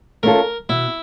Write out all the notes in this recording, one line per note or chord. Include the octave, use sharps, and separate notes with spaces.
A3 C#4 F4 A4 A#4
B2 E4